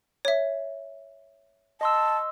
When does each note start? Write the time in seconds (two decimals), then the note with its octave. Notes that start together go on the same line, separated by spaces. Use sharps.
0.25 C#5 E5
1.81 D#5 A5 C6 E6